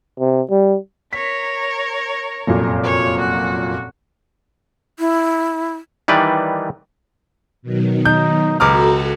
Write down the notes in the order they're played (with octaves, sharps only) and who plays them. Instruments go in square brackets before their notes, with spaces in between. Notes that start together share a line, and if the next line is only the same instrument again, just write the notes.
[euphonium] C3
G3
[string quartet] A#4 C#5 [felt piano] B6
[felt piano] F1 F#2 A#2
[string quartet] C#5
F#4
[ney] E4
[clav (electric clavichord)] D#3 E3 G3 B4 D5
[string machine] B2 D#3 F#3
[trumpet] D#4 [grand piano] G6
[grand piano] C#2 D6 F6 [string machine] F#4 A4 [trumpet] A#5